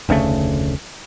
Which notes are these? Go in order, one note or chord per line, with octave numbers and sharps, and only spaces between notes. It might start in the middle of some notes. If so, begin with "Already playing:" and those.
F1 D2 C#3 A3